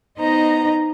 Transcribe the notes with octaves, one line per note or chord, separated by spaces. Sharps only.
B3 D#4 C5 D#5 A#5